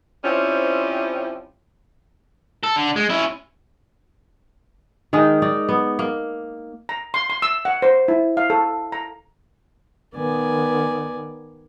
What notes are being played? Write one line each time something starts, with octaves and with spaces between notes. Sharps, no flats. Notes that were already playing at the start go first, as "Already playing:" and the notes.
F3 G3 C4 C#4 E4
A4
D3
G#3
C#4 E4
D#3 G#3 D#4 A#4
D#4 D5
B3
A#3
A#5
C6
C6
E6
F#5
C5
E4
F5
A4
A#5
D#3 B3 D5 G#5